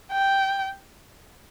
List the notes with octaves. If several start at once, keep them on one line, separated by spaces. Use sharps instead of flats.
G5